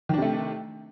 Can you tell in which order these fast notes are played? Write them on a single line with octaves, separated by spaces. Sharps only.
D#3 D4 C3 A3